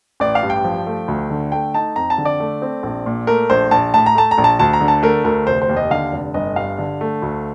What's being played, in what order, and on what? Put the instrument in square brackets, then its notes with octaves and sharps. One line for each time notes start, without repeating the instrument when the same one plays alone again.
[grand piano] A1 D5
F5
G2
G5
F3
A3
D2
D3
A3 G5
D#4 A5
F2 A#5
A5
D3
D5
A3
C4
A#1
A#2
A3 A#4
A#1 C5
A#1 A5
A2 A5
A#5
A3 A5
A#5
A#1
A5
D2 A5
A#5
D3
A5
A3 A#4
D2 A#4
F1 C5
C5
D#2
D#5
D3 F5
F1
G1 D#5
G2 F5
D3
A3
D2